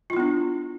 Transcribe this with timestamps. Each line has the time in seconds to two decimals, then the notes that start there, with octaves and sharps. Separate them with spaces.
0.10 F4
0.13 E4
0.17 B3
0.20 D4